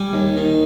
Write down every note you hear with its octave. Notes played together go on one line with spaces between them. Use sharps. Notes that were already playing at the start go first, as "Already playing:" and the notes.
Already playing: G3 G#5
D#2
D#3